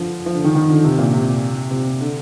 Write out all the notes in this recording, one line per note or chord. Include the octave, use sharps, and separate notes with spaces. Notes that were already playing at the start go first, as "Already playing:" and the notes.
Already playing: D3 F3
F3
D3
D#3
D#3
D3
C3
A#2
C3
C3
D3